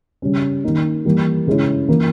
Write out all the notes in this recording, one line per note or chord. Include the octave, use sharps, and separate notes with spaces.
C#3 G3 C#4
D#3 A#3 D#4
E3 G3 A#3
C#3 G#3 C#4 E4
E3 A#3 E4